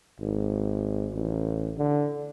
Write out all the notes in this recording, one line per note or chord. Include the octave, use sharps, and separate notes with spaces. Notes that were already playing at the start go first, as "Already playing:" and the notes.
G#1
A1
D3